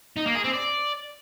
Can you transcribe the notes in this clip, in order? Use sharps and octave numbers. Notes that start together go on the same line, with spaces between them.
D#4
A#3
G#4
C4
D5